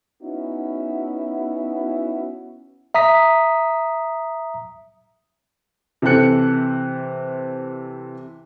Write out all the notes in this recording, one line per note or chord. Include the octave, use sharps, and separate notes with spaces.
B3 C#4 D#4 E4 F#4
E5 A#5 D#6 B6
C3 E3 A4 G5 F#6 C#7